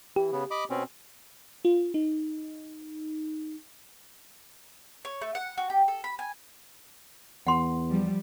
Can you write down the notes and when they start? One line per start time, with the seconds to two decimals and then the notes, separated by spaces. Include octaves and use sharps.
0.16 E3 G4
0.32 C#3 B3
0.51 D#5 B5 D6
0.70 B2 C4 C#4
1.65 F4
1.94 D#4
5.05 C#5
5.21 A3
5.35 F#5
5.58 F#4
5.70 G4
5.88 A4
6.04 B5
6.19 G#5
7.47 E2 F#5 C6
7.90 F3 G3